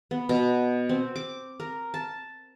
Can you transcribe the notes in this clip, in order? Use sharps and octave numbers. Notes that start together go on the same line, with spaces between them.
B3
B2
C4
D6
A#4
A5